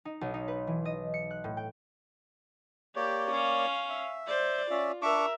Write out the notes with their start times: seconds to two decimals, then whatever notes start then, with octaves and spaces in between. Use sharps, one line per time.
0.05 D#4
0.21 B1
0.34 D#4
0.48 B4
0.67 E3
0.85 D#5
1.14 C#7
1.31 F#6
1.44 A2
1.57 G5
2.96 A#3 G4 C#5 D5
3.31 C#4 F5
3.89 E5
4.27 C5 D5
4.70 C#4 F4 D5 E5
5.02 D4 A#4 E5 C#6 D6